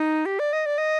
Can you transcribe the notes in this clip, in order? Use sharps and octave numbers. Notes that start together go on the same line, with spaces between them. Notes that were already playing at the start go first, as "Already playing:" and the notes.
Already playing: D#4
G4
D5
D#5
D5
D#5